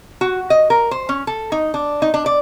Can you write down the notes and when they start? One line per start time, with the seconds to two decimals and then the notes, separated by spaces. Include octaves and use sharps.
0.21 F#4
0.50 D#5
0.70 A#4
0.91 C5
1.09 C#4
1.27 A4
1.52 D#4
1.74 D4
2.02 D#4
2.14 D4
2.26 D5